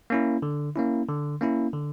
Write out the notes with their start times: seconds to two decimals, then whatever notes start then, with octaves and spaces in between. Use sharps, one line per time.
0.10 A#3 C#4 E4
0.42 D3
0.76 A#3 C#4 E4
1.09 D3
1.41 A#3 C#4 E4
1.73 D3